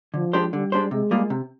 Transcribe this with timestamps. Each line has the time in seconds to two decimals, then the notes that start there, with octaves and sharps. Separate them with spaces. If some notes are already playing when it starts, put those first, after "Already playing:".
0.14 D3 F3
0.33 G#3 D4 G4 C5
0.53 D3 G3
0.72 G#3 D4 G4 C5
0.91 C3 G#3
1.11 G3 A#3 F4 G#4
1.30 C3